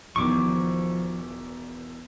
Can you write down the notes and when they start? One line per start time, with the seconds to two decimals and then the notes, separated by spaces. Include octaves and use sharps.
0.16 E1 E2 D#3 F3 C#6 D6